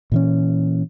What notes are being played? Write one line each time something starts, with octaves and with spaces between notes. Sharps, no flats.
A#2 E3 C#4